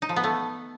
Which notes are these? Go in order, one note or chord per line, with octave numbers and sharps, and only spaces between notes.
D#4
F3
B3
A3